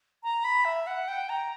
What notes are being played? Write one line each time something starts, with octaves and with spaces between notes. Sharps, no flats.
A#5
B5
E5
F#5
G5
A#5